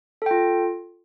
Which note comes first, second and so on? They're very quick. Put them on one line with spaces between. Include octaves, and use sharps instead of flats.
A4 G5 F4